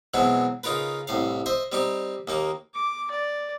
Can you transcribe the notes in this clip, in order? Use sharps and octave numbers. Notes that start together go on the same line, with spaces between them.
B2 E3 F#3 G#3 C4
C#3 D#4 F4 A#4 B4
C2 A2 F5
C5 D#5 E5
G3 C4 D#4 G4
D#2 A#3 D#4
D6
D5